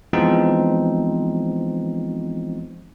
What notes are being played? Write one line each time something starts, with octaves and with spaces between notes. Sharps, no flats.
E3 F3 G#3 B3 C4 D#4